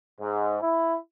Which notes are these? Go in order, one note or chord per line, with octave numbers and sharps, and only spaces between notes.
G#2
E4